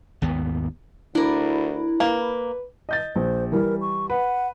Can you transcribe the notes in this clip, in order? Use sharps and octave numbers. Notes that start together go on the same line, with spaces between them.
G#1 D#2 B3
D2 D4 E4 A#4
A#3 B4
D#5 G6 A6
A#1 C5
E3 G3 A#4
C#6
B4 F#5